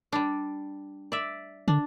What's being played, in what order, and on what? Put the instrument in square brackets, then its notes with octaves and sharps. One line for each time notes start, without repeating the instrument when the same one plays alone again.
[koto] G3 D4
D5 E5
[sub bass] D3 [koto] D4